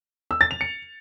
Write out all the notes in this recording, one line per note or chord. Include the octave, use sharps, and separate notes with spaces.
E6
A6
F7
C#7